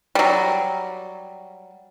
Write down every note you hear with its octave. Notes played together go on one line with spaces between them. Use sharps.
F#3 G3